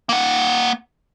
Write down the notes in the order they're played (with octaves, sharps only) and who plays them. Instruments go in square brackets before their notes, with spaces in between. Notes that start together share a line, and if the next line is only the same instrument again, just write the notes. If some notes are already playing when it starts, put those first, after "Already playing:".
[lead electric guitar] A#3 F#5